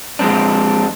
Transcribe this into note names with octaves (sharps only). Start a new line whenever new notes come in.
F3 G#3 A3 C4 D4